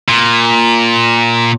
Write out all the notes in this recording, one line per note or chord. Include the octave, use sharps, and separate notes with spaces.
A#2